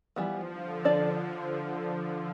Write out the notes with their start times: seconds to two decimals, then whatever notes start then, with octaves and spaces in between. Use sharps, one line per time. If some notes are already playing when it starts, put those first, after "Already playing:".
0.16 E3 F3 G3 B3
0.51 D3
0.85 D4 A4 D5